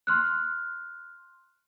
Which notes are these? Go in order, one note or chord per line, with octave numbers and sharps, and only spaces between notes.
C6 F6 F#6